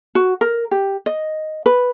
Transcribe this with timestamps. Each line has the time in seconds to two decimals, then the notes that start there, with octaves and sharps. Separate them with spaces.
0.15 F#4
0.41 A#4
0.71 G4
1.06 D#5
1.66 B4